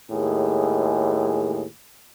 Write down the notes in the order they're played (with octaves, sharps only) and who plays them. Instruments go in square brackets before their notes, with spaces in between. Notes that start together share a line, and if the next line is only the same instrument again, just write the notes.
[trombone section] D#2 A2 G#3 G#4